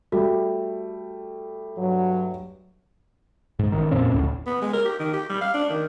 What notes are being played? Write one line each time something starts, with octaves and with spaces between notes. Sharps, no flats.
G3 A3 F#4
G2 F#3
G#2
A1 D#3
F2 A#2 C4 C#4
G#1 D2 A2
B3
G#3
A#4
G4
D#3
G4
G3
F5
D4
D#3